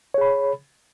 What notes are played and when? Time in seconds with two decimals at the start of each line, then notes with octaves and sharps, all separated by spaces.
0.14 C#5
0.18 G#4
0.21 B5